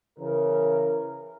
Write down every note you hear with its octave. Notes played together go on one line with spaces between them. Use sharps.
C#3 E3 A#4